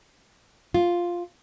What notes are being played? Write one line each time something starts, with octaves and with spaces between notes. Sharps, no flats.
F4